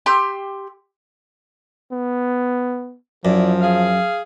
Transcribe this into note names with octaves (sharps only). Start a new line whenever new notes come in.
G4 C6 E6 G6
B3
F#2 F3 E4 D5
G#4 F5